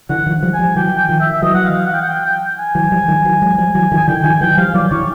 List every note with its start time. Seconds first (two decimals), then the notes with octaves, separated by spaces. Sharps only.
0.09 D3 E3 F#5
0.26 D#3 F3
0.43 F3 G3
0.54 G#5
0.59 F3 G3
0.76 E3 F#3 G5
0.98 G5
1.09 D#3 F3
1.20 E5
1.42 E3 F#3 D#5
1.54 F#5
1.65 F5
1.86 F#5
1.94 G5
2.01 F#5
2.09 G5
2.25 G5
2.59 G#5
2.75 E3 F#3
2.92 F3 G3
3.08 D#3 F3
3.24 E3 F#3
3.42 F#3 G#3
3.58 F3 G3
3.74 E3 F#3
3.92 D#3 F3
3.97 G#5
4.08 D3 E3 G5
4.24 D#3 F3 G#5
4.41 E3 F#3 G5
4.58 F3 G3 F5
4.74 E3 F#3 D5
4.91 D3 E3 C#5